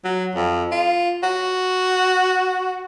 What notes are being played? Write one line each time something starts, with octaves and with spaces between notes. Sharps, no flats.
F#3
F2
F4
F#4